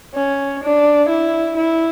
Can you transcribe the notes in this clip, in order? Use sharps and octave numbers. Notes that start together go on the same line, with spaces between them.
C#4
D4
E4
E4